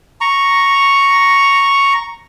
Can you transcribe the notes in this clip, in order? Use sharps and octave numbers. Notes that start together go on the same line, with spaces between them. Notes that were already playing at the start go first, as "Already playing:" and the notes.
A#5 C#6